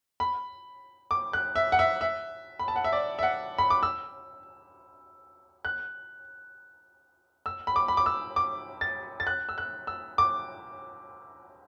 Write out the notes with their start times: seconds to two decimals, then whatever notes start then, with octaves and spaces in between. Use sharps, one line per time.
0.20 B5
1.11 D6
1.33 F#6
1.56 E5
1.72 F#5
1.79 E5
2.01 E5
2.59 B5
2.68 A5
2.76 F#5
2.84 E5
2.92 D5
3.19 E5
3.23 F#5
3.58 B5
3.70 D6
3.83 E6
5.65 F#6
7.46 E6
7.67 B5
7.76 D6
7.88 B5
7.97 D6
8.06 E6
8.36 D6
8.81 A6
9.20 A6
9.27 F#6
9.49 E6
9.58 F#6
9.87 E6
10.18 D6